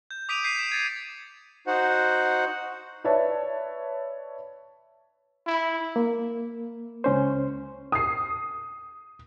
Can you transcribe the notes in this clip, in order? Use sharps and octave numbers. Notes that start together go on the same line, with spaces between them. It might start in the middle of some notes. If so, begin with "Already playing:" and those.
G6
D6 D#6 B6 D7 D#7 F7
G6 B6 C7 D#7
E7
G#6 A6 C#7
D#4 F#4 C5 F#5
B4 C#5 D5 E5 A5
E4
A#3
C#2 C#4 C5
D#6 C7